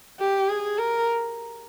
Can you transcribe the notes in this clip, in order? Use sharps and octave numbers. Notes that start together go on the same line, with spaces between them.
G4
G#4
A#4